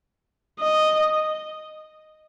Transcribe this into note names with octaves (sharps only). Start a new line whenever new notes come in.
D#5